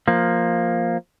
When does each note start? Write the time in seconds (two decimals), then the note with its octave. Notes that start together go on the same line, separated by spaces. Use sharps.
0.08 F3 A#3